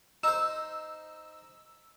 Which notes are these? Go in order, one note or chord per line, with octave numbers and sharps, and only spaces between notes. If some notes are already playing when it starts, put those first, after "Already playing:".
D#4 C5 E6